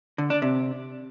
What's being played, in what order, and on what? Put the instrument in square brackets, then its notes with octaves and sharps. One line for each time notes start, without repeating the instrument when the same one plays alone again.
[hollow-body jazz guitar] D3
D4
C3